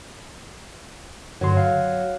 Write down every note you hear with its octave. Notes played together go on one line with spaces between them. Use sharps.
G2 D3 F#3 C6
F5